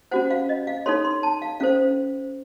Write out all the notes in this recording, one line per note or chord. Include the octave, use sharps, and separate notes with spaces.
C#4 F#4 C5 F#5
F5
D#5
F5
D#4 A4 C#5 C6
C6
A5
F5
C#4 A4 C5 F5